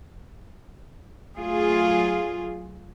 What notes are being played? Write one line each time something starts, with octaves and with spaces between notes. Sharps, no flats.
F#3 A3 F4 G#4